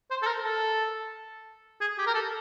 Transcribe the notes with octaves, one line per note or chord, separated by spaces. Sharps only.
C5
A4
A#4
A4
G#4
G4
A#4
A4